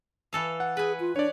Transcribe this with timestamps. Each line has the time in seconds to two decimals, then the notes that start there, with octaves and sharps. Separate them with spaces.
0.33 E3 A4 F5
0.60 F#5
0.77 G#4 B4 G#5
1.00 F4
1.16 D4 C#5 D5